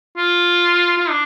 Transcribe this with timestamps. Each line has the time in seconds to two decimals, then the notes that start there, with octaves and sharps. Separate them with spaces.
0.17 F4
0.97 F4
1.10 D4